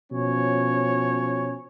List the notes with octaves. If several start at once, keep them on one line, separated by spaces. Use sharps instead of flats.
B2 F3 C#4 C#5